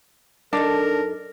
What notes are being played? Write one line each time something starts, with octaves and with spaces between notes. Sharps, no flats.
F#2 D4 D#4 A4 A#4